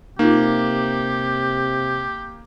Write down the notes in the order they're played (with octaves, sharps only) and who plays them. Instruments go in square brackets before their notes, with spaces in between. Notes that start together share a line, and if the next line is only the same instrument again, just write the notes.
[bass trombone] C3 [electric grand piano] A#3 [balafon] D#4 F4 [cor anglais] G4